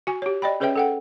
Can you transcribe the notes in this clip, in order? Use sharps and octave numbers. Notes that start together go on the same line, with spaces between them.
F#4 G#5
G4 C#5
D5 D#5 G5 B5
C#4 G#4 B4 C#5 E5 G5
A4 F#5 G5